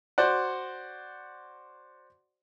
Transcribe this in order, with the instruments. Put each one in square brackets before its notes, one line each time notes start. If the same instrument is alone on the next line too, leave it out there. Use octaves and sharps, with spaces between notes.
[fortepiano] F#4 C5 D5 F#5